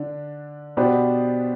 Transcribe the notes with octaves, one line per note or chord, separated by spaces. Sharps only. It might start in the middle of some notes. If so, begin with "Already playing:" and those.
Already playing: D3 D4
B2 B3 D4 G4 C5